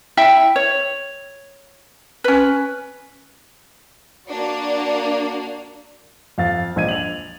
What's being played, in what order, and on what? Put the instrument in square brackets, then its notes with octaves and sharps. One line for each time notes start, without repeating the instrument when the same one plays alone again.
[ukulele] E4 E5 G5
C#5
C#4 B4
[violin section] A#3 D4 F#4 D5
[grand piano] F2 F5 A6
A#1 D#5 G#6 D#7
F7 F#7